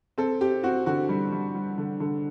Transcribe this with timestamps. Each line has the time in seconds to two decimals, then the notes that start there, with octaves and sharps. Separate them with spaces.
0.18 C4 A4
0.41 C4 G4
0.63 C4 F#4
0.86 D3 F#4
1.09 G3
1.32 G3
1.55 G3
1.78 D3
2.00 D3